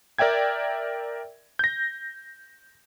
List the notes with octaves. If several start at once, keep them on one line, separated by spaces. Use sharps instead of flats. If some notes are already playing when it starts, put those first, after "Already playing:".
A#4 D5 E5 G5 G#6
G6 A#6